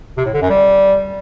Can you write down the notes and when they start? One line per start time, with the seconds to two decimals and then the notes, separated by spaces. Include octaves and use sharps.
0.17 C3
0.25 A2
0.33 D3
0.42 F#2
0.50 G3